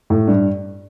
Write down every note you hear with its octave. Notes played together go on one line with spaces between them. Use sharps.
A2
G2